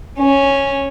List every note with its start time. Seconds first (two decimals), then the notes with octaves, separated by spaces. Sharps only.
0.20 C#4